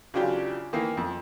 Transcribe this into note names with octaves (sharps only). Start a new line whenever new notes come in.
C#3 E3 F#3 D4 F4 G4
D#3 E3 A#3
F2